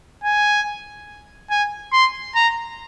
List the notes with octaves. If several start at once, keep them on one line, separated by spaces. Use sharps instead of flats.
G#5
G#5
C6
A#5